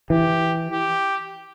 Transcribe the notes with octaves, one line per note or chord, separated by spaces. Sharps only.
E3 G4
G4